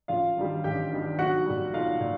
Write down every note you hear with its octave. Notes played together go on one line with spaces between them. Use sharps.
A1 F4 F5
G2 D#3 G3
A1 G4 G5
G2 D#3 G3
B1 F#4 F#5
A#2 G3
B1 F4 F5
A#2